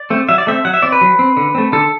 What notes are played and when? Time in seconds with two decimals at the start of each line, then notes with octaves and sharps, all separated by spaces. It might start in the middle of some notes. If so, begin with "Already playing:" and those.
Already playing: D5
0.10 A3 C4
0.29 F#3 E5
0.38 D5
0.47 A3 C4 E5
0.65 F#3 F#5
0.74 E5
0.82 C4 D5
0.92 B4
1.01 F#3
1.19 C4
1.37 D3
1.55 A3 C4
1.72 D3 A4